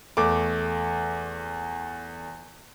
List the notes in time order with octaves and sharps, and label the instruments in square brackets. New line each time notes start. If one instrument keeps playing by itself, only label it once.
[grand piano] E2 A3 D6